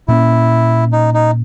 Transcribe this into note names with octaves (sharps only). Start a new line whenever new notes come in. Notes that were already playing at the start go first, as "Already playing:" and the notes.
A#2 A#3 C#4 E4
D#4
D#4